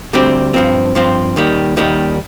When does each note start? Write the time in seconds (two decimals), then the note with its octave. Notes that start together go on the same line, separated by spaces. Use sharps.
0.13 D2 D3 G3 C4 G4
0.54 G2 F3 C4
0.95 G2 F3 C4
1.36 D#2 D#3 G3
1.77 D#2 D#3 G3